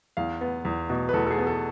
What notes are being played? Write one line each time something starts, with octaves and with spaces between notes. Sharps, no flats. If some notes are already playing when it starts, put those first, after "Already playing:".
E2 F5
B3
E2
B2
B4
E2 A4
A4
G#4
B3
A4